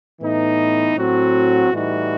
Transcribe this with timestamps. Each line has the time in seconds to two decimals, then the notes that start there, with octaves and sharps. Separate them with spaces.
0.22 A2 E3 B3 D#4
0.96 A2 F#3 C4 F#4
1.72 A2 E3 G3 D#4 F#4